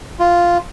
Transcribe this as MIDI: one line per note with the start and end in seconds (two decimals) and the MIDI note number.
0.20 0.58 65